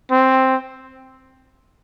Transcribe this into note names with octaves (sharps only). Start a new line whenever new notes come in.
C4